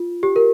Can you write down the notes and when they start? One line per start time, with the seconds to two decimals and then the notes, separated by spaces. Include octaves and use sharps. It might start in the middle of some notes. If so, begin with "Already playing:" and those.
Already playing: F4
0.23 G4
0.36 A#4